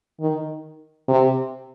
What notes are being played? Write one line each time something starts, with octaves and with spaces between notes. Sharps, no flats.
D#3
C3